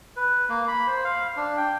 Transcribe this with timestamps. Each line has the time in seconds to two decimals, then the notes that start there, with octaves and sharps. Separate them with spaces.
0.16 B4
0.49 A#3
0.68 B5
0.87 C5
1.04 F5
1.36 D4
1.57 G5